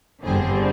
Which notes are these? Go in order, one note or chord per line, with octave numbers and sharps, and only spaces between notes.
G1 G2 D3 G3 C4 G#4